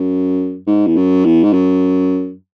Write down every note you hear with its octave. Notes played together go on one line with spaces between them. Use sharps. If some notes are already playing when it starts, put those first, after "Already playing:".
Already playing: F#2
G#2
E2
F#2
E2
G#2
F#2